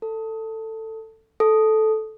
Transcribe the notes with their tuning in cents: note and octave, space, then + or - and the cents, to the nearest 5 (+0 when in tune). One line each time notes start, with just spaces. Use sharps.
A4 +15
A4 -10